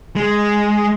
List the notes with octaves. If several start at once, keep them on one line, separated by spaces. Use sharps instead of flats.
G#3